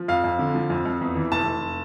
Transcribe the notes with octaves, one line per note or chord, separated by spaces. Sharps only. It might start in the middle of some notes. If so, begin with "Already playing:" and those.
Already playing: F3
F2 F5
F2
D3
F3
F2
F2
E2
E3
F1 A5
F1